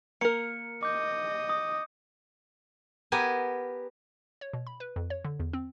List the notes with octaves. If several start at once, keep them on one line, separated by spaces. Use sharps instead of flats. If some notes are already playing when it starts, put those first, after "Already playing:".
A#3 A#4 C#7
D#5 D6 G6
D#6
B3 G4 A#4 G#5
C#5
B2
B5
B4
F2
C#5
D3
E2
C4